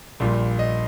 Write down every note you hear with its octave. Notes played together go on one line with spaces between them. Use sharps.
A#1 A#2 G3
D#5